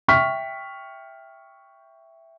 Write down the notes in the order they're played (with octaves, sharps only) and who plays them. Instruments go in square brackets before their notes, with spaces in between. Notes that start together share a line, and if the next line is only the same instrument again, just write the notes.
[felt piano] E5 G5 C#6 F6 B6